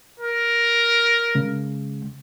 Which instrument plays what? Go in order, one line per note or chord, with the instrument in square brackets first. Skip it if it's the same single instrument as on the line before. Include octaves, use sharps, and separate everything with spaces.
[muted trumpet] A#4
[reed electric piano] C#3 G#3